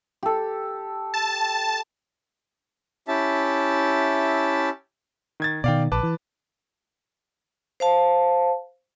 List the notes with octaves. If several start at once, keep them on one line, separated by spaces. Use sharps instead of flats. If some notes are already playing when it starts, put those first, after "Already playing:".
G4 A4
A5
C#4 E4 G4 E5 A5
D#3 G#6 A6
B2 D#3 D5 F5 G5
A#1 B4 A5 D6
E3
C5 F5 A5